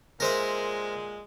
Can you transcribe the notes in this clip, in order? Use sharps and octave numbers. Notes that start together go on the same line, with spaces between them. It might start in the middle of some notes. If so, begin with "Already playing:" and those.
A#2 G#3 A#4 C5 E5